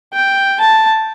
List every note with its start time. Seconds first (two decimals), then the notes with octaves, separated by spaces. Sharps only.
0.13 G5
0.60 A5